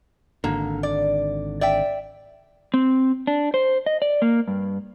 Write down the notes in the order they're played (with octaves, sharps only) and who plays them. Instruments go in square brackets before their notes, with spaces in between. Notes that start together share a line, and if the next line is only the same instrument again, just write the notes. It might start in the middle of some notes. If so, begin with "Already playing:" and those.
[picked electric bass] G#1 D3 [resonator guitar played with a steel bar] A#3
[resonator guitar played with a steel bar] D5
D5 E5 G5
[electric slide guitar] C4
D4
C5
D#5
D5
A#3
G2